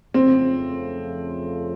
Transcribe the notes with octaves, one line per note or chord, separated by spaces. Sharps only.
F2 C#3 F3 A3 C4